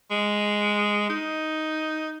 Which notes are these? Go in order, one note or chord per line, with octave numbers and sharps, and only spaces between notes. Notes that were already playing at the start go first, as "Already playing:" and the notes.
G#3
D#4